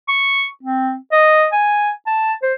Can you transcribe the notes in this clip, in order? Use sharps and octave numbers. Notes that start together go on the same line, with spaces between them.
C#6
C4
D#5
G#5
A5
C5